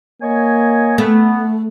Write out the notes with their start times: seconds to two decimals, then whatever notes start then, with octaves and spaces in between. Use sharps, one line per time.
0.22 A#3 C#5 D#5 G#5
0.98 A3 B3